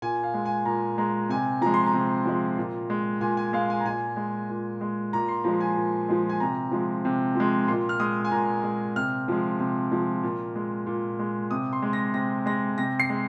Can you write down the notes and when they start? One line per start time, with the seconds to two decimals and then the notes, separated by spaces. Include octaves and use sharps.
0.02 A#2 G#5
0.23 F5
0.34 G#3
0.45 G#5
0.66 A#2 A#5
0.98 G#3 A#5
1.29 C3 G#5
1.62 F3 G#3 A#5
1.74 C6
1.87 A#5
1.93 C3
2.26 F3 G#3
2.58 A#2
2.90 G#3
3.21 A#2 G#5
3.37 G#5
3.53 G#3 F5
3.70 G#5
3.80 A#5
3.85 A#2 G#5
4.17 G#3
4.49 A#2
4.81 G#3
5.13 A#2 A#5
5.28 C6
5.44 F3 G#3 A#5
5.60 G#5
5.77 A#2
6.09 F3 G#3
6.29 G#5
6.40 C3 A#5
6.72 F3 G#3
7.05 C3
7.35 F3 G#3
7.68 A#2 C6
7.89 F6
8.00 G#3 D#6
8.25 G#5
8.32 A#2 A#5
8.63 G#3
8.96 C3 F6
9.28 F3 G#3
9.59 C3
9.92 F3 G#3
10.23 A#2
10.55 G#3
10.87 A#2
11.19 G#3
11.51 C3 D#6
11.73 C6
11.82 G#3
11.93 A#6
12.14 C3 A#6
12.46 G#3 A#6
12.78 C3 A#6
13.00 C7
13.10 G#3